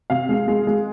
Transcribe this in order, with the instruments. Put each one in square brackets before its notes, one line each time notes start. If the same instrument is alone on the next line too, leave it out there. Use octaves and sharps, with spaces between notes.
[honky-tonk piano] C3 F5
G#3
G#3
G#3